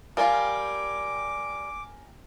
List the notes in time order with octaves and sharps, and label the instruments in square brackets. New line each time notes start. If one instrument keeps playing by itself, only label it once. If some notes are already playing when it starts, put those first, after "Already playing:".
[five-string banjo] G3 F4 [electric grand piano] A#4 G5 G#5 [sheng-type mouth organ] D6